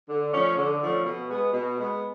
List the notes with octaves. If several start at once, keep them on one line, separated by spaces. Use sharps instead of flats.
D3
F3 A3 C#4
D3
F3 A3 C#4
B2
G#3 B3
B2
G#3 B3